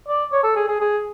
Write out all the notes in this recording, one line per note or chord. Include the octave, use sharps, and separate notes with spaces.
D5
C#5
A4
G#4
G#4
G#4